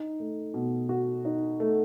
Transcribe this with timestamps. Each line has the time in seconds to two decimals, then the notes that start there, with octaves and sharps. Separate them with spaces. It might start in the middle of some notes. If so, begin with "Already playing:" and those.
Already playing: D#4
0.20 A3
0.54 B2
0.89 F#4
1.25 D#4
1.60 A3